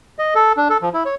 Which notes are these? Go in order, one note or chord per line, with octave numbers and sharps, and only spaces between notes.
D#5
A4
D4
A4
F3
E4
C#5